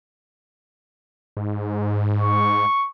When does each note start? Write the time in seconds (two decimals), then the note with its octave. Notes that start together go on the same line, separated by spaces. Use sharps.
1.37 G#2
2.22 C#6